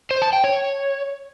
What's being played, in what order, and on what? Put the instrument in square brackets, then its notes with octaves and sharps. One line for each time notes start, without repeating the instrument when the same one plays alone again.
[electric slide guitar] C5
A5
G5
C#5